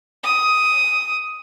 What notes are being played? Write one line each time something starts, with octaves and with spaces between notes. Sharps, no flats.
D#6